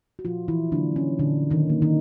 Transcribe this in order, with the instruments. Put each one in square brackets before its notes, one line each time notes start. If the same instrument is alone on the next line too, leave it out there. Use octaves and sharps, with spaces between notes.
[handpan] F#4
A#2 F3 F4
E3 E4
D3 F#3 A#3 D4
C#4
A#2 D3 D4
D#3 D#4
F#3 A#3
D#3 D#4